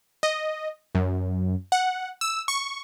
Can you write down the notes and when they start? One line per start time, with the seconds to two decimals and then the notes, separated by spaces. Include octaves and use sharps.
0.23 D#5
0.95 F#2
1.72 F#5
2.21 E6
2.48 C#6